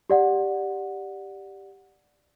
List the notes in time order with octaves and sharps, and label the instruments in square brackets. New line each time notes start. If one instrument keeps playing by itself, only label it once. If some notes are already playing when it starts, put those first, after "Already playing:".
[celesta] G4 D5 F#5